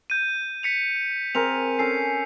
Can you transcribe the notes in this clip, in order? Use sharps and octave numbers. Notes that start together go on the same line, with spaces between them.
G6 D#7
B6 C#7 F7
C4 G#4 A#4 F7
C#4 A4 C7